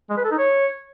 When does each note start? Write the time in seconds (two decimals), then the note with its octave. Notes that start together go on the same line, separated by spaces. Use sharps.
0.10 G#3
0.17 B4
0.24 A4
0.32 D#4
0.39 C#5